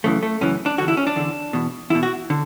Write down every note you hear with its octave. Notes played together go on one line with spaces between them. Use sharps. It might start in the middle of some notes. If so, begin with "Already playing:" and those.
F#2 C#3 E3 A3
A3
F#2 C#3 E3 C#4
D4
E2 D3 F#4
E4
C#4
D4
E2 D3
E2 B2
E2 B2 E4
F#4
D3